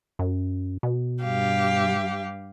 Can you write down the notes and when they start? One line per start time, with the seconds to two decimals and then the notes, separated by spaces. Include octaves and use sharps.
0.19 F#2
0.83 B2
1.23 G2 G4 F5